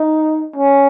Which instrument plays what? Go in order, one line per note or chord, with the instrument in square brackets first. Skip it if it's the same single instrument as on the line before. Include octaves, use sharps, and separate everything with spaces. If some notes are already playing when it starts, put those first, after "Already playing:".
Already playing: [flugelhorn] D#4
C#4